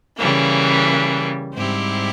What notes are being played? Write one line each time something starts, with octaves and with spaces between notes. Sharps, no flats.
C#3 E3 G3 A#3
G#2 G3 C4 E4 G4